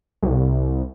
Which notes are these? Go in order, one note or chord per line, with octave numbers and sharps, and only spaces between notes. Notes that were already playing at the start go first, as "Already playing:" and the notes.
C2